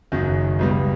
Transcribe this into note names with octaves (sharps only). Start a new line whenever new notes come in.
F#1 F#2 D#3 F#3
C#2 B2 G3